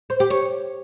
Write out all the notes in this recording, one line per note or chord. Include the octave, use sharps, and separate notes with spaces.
C5
G4
C#5